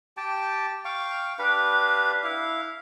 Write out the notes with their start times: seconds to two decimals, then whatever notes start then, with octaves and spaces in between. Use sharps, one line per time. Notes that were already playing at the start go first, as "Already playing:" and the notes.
0.17 G4 G5 A5
0.85 F5 G5 C#6
1.39 D4 G4 B4 F5
2.24 E4 F5